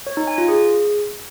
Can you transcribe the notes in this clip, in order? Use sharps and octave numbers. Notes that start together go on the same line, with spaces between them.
C#5
D#4
G#5
F4
G#4